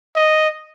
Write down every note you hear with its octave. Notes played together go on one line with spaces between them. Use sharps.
D#5